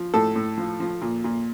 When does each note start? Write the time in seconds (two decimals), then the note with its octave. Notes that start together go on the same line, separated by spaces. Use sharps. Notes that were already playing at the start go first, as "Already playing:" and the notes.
Already playing: F3
0.14 A2 A4
0.36 A2
0.58 F3
0.80 F3
1.02 A#2
1.24 A#2